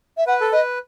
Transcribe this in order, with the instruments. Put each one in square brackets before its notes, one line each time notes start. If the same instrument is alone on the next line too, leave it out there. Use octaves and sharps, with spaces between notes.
[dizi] E5
[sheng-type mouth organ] B4 [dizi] F#5
[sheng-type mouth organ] A4
[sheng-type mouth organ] B4 [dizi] D#5